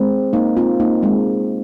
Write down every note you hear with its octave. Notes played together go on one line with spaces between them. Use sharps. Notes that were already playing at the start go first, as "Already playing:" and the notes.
Already playing: G#3 C4
A#3 D#4
C4 F4
A#3 D#4
G#3 C4